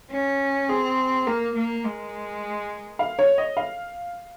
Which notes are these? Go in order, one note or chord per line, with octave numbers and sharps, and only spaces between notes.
C#4
C4 G#4
A#3 A#4
A#3
G#3
F5
C#5
D#5
F5